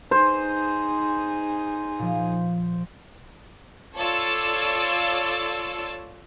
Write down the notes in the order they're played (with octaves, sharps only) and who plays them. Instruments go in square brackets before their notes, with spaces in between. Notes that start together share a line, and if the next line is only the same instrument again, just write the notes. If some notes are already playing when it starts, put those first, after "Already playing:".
[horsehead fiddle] D#4 G#4 [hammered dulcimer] C5
[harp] A#2 F3
[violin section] F4 A4 C#5 D5 E6 A6